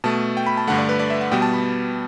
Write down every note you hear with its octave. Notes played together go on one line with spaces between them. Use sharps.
B2 A3 A5
G5
B5
A5
G2 D3 A3 F#5
D5
B4
D5
E5
F#5
B2 G3 B3 G5
A5
B5